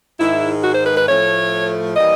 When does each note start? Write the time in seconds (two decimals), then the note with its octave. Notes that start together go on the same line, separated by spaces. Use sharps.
0.19 G#2 D#3 G#3 E4
0.64 F#4
0.74 C5
0.86 B4
0.97 B4
1.08 A2 F3 A3 C#5
1.96 E3 G3 A#3 D#5